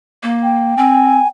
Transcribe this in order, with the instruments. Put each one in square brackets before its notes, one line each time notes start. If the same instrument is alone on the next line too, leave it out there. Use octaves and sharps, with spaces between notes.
[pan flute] A#3
[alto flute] G5
[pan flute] C4 [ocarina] G#5